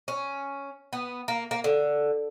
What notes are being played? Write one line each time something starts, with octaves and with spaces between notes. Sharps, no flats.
C#4
B3
A#3
A#3
D3